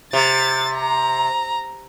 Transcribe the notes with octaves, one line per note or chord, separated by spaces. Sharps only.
C3 A6
A#5